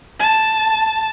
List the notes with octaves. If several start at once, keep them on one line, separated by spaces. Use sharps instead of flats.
A5